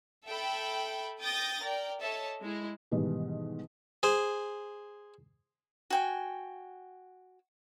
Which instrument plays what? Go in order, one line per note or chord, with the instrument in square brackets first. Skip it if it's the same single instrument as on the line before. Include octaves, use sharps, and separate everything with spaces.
[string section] A4 E5 G5 B5
G5 D#6 G6 A6 A#6
A#4 D5 G5
A4 C#5 D#5 E5 A5
G#3 E4
[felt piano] G#2 B2 D#3 E3 G3
[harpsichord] G#4 C5
[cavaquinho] F#4 G5 G#5